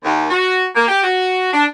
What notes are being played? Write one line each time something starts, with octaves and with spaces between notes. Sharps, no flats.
D#2
F#4
A#3
G4
F#4
D4